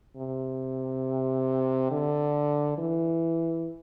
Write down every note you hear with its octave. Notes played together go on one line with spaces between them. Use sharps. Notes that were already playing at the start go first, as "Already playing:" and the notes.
C3
D3
E3